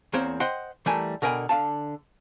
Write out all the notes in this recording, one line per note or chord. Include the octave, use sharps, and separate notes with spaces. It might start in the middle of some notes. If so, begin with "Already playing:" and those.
E2 A#3 C4 C5 C#5 C6
C5 D#5 F#5 G5 C6
E3 G3 A3 A#4 G#5
B2 D3 A#4 G5 G#5 B5
D3 F5 A5